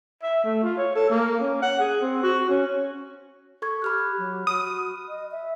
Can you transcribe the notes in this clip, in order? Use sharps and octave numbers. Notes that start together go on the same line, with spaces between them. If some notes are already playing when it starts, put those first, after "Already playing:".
E5
A3
F4
C#5
A4
A#3
C#4
F#5
G#4
C4
F#4
C#4
A4 C#6 G#6
G4 B5 F6 F#6
F#3
F#4 D#6
D#5
E5